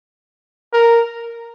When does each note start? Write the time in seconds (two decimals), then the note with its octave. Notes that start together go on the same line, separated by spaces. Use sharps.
0.73 A#4